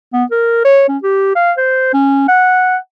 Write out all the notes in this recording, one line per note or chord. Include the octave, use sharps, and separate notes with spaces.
B3
A#4
C#5
C#4
G4
F5
C5
C#4
F#5